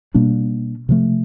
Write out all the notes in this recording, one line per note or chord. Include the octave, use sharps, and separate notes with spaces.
B2 G3 A#3 D4
C3 F3 A3